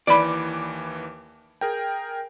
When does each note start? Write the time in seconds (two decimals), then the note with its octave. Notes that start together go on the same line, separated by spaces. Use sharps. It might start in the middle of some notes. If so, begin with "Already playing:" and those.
0.07 D#2 E3 D5 B5 D6
1.61 G#4 A#4 G5